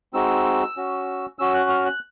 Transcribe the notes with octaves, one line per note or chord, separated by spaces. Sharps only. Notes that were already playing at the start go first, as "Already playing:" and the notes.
G#3 C4 D#4 F#4 E6
C#4 F#4
C#4 F#4 E6
F#6
F6
F#6